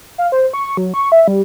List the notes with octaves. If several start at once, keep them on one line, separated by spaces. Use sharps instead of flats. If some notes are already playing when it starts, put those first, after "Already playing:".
F5
C5
C#6
F#3
C#6
E5
G3